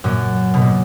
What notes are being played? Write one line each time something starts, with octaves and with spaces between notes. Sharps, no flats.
F#2 A#2
B2
A#2